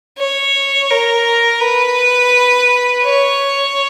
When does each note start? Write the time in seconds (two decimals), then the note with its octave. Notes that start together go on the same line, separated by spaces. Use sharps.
0.18 C#5
0.90 A#4
1.61 B4
3.04 C#5